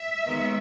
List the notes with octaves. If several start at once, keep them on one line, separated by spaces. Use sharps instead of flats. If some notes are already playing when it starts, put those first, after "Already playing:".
Already playing: E5
D#2 D#3 G#3 B3